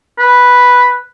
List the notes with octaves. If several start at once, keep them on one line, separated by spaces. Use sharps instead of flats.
B4